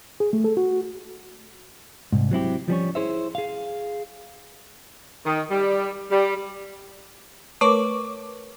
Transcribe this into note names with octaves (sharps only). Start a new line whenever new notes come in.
G#4
A3
A4
F#4
C2 G#2
F#3 C4 E4 G4
F3 G3 C#4 C#5
E4 G#4 C5 C#5 E5
G#4 F5
D#3
G3
G3
A3 A#4 B4 C#5 C#6 D6